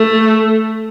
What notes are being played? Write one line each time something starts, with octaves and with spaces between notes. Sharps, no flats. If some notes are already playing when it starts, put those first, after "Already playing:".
Already playing: A3